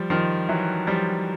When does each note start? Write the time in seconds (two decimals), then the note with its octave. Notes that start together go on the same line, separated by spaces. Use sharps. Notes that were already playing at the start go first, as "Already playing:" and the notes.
Already playing: F3 G3
0.10 D#3 F3
0.49 E3 F#3
0.87 F3 G3